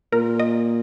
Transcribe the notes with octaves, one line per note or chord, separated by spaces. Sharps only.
A#2 A#4
D#5